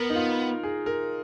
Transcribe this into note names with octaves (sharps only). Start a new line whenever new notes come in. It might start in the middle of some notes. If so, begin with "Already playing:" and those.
Already playing: B3 A#4
D#4
F4
G#4
A#4